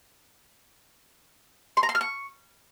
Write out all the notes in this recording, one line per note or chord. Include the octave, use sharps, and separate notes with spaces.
C6
A#5
C6
F6
C#6